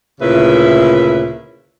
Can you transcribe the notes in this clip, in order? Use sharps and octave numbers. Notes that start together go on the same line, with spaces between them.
D2 A#2 C#3 E4 B4 E5